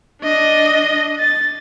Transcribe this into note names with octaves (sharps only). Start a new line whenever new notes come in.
D4 D#5
A6